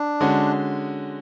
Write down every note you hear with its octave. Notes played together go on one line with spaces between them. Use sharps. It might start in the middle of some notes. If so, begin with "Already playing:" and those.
Already playing: D4
D3 G#3 C#4 F#4